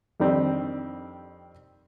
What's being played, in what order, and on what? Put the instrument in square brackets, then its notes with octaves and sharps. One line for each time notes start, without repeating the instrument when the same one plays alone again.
[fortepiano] F2 D#3 G3 C4 D4